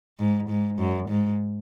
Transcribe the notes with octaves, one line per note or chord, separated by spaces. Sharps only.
G#2
G#2
F#2
G#2